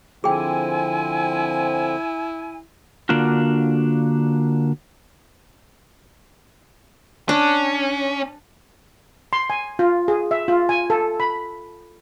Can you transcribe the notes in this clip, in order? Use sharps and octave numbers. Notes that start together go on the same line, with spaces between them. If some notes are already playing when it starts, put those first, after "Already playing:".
D3 F3 C4 E4 G#4 G5 G#5
D3 A#3 D4 F4 F#4
C#4 D4
C6
G#5
F4
G#4
E5
F4
G#5
A4
B5